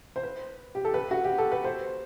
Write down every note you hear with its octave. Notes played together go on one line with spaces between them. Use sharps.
C5
B4
G4
A4
B4
F#4
G4
A4
B4
C5